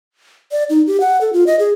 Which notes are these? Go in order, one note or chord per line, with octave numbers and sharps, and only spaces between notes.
D5
D#4
G4
F#5
A4
F4
D#5
G#4